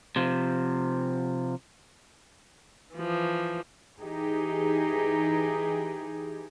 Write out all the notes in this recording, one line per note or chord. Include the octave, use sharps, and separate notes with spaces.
C3 F3
E3 F3
E3 D#4 G4 G#4